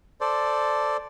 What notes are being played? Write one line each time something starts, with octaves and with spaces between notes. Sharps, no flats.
A4 C5 D5